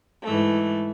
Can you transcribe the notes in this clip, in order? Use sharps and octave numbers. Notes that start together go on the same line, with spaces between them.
G#2 E3 A3